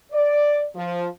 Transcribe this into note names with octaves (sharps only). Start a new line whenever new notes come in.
D5
F3